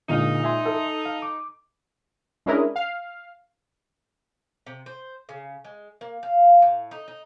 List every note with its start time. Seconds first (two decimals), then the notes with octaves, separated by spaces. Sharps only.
0.09 A#2 D3 G#3 D#4 D#5 F5
0.44 E5 G#5 C6
0.65 A4
1.06 F5
1.22 D6
2.46 G#3 C#4 D4 E4 A#4 D#5
2.76 F5
4.67 C3
4.86 C5
5.29 C#3
5.64 G#3
6.01 A#3
6.23 F5
6.62 A2
6.91 D#4
7.08 D#4